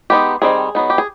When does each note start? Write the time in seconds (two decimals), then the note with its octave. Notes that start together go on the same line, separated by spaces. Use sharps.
0.10 G#3 B3 D#4 G4
0.42 D#3 G3 C4 D#4 G#4
0.75 F#3 B3 D#4
0.90 G4
0.98 G#4